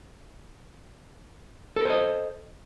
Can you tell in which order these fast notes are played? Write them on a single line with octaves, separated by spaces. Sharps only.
A4 A#4 C5 D#5